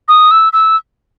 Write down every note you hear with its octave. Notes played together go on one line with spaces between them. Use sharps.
D#6
E6
E6